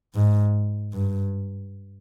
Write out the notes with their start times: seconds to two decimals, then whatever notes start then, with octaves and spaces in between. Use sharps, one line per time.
0.15 G#2
0.94 G2